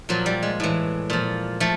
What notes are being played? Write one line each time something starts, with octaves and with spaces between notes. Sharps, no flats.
A#2 F3 F#3
G3
G#3
A2 E3
A#2 F3
F3 A3